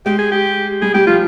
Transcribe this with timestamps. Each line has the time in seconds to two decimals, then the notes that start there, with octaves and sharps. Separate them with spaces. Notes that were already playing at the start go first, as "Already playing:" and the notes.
0.06 G#3 G4
0.18 G#4
0.31 G4
0.81 G3 G#4
0.94 G3 G4
1.07 F3 F4